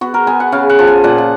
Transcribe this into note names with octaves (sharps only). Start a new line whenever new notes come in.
B3 F#4
A#4
B3 G#5
F#5
C#3 F5
F#5
F3
G#5
A#2 F#5
F#5